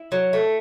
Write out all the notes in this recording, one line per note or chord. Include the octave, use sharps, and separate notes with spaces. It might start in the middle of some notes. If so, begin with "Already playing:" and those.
Already playing: E4
F#3
A3